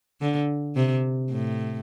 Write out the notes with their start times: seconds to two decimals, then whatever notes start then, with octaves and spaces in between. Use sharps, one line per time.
0.21 D3
0.76 C3
1.31 A2